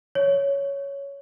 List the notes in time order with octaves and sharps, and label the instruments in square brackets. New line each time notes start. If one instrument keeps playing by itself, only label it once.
[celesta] C#5